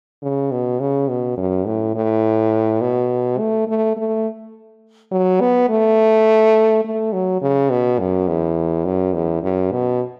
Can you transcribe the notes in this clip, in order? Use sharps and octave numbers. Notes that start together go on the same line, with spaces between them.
C#3
B2
C#3
B2
F#2
A2
A2
B2
A3
A3
A3
F#3
B3
A3
A3
F#3
C#3
B2
F#2
E2
F#2
E2
F#2
B2